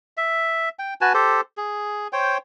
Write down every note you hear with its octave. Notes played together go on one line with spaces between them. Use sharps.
E5
G5
F#4 B4 G#5 A5
G4 A4 C5
G#4
C5 C#5 G5